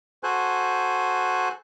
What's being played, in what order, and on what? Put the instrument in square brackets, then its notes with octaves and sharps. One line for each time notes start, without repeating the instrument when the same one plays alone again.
[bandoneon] F#4 A4 C5 G#5 F#6